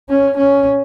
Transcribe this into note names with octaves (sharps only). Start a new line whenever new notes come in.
C#4
C#4